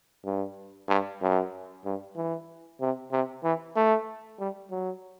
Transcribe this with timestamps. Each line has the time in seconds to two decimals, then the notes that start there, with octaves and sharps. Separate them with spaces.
0.25 G2
0.89 G2
1.21 F#2
1.85 G2
2.17 E3
2.81 C3
3.12 C3
3.44 E3
3.76 A3
4.39 G3
4.71 F#3